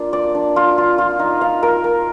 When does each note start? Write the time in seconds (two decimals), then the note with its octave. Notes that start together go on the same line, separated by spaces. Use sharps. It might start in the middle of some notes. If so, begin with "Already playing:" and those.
Already playing: A#3 D4 F4
0.13 D5
0.35 D4
0.56 F4
0.78 F4
0.98 F4
1.19 D#4
1.41 F5
1.63 A#4
1.84 A#4